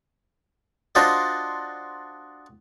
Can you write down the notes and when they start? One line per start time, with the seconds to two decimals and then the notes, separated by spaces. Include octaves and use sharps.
0.95 D4 F4 F#4 C5 D5 D#5